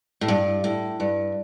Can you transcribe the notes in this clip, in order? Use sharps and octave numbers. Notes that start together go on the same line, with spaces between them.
A2
G2
A2
G2